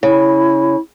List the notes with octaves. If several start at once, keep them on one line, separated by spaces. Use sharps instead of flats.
C#3 E4